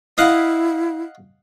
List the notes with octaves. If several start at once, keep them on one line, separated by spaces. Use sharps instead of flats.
E4 D#5 F5 F#5